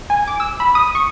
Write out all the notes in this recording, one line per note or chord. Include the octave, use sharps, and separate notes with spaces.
G#5
D6
E6
B5
D#6
C#6